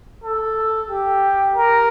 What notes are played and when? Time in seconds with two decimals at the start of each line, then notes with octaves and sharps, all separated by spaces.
0.24 A4
0.90 G4
1.56 A#4